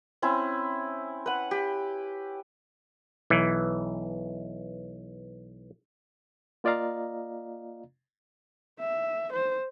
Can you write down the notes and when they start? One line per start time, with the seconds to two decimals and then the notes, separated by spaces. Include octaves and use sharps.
0.22 C4 C#4 E4
1.26 B4 F#5
1.51 G4
3.30 B1 E3
6.64 A#3 F4 D5 D#5 F5 A#5
8.80 E5
9.33 C5